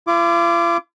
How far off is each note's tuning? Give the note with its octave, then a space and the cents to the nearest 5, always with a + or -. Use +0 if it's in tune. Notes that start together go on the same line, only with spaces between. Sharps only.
F4 -45 D6 +0